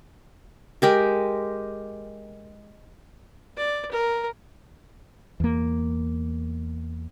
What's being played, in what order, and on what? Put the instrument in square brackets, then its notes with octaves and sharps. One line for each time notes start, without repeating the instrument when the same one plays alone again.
[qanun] G#3 G4 A#4
[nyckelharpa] D5
A#4
[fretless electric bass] E2 A#3